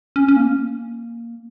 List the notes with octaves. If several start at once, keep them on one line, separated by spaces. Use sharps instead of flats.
C#4
C#4
A#3
C#4
A#3